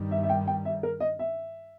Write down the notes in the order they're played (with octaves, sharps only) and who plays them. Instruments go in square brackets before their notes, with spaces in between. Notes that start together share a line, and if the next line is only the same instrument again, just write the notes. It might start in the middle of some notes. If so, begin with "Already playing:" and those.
Already playing: [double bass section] G2 D#3 G3
[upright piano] E5
E5
G5
G5
E5
A#4
D#5
E5